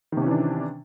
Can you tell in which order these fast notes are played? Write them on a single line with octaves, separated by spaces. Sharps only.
D#3 C3 C#4 E3 D4